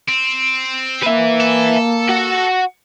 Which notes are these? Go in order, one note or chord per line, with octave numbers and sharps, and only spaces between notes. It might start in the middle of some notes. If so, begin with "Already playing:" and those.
C4
A#3 B4 E5
A4
F#4 F#5